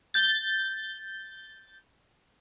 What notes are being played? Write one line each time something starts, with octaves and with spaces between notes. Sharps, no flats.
G6 A6